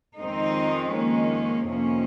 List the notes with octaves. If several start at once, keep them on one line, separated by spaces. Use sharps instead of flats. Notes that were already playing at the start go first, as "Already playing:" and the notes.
F2 D#3 G#3 C4 D#4
A#3 C#4
F2 C3 D#3 A#3 C#4